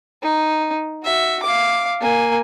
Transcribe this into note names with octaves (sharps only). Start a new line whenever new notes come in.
D#4
F#4 E5
F5 D6
A#3 G#5